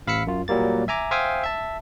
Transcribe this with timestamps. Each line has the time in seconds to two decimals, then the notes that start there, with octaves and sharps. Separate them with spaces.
0.07 A1 F5 B5 E6 B6 C#7
0.27 F#2 F4
0.48 A#2 F#3 G3 A#3 A6
0.88 E5 G#5 A#5 D6
1.11 C5 E5 F5 G5 G#5 D#6
1.43 E5 A5